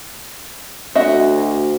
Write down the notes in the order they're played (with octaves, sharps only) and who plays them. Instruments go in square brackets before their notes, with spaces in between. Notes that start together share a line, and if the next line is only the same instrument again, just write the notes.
[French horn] D2 [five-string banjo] F#4 D#5 E5